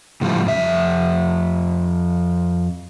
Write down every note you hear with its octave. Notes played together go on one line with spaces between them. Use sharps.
A2 C#3 F3 G3 A3
F2 E5